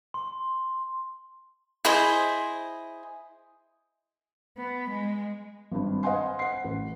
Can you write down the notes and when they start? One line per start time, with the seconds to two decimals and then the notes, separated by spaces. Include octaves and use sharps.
0.14 C6
1.85 E4 G#4 C5 D#5
4.57 B3
4.90 G#3
5.71 G#1 G2
6.03 C5 D#5 F5 F#5 G#5 C6
6.39 F#5 C7
6.64 A1